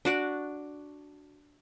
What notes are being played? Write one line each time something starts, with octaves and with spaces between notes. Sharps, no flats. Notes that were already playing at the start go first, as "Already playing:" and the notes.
D4 F#4 D5